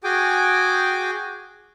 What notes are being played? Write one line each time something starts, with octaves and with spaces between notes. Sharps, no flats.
F#4 G#4 G5 G#5 D6